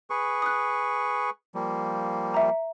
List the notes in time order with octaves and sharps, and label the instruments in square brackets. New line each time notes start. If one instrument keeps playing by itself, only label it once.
[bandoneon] G#4 B4 C#6
[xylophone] D#6 F#6
[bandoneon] F3 G3 A#3
[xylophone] E5 A#5